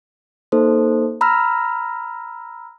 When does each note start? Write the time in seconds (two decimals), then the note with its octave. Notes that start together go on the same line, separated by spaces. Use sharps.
0.52 A#3 D#4 A4 C5
1.21 A#5 B5 E6 F6 A#6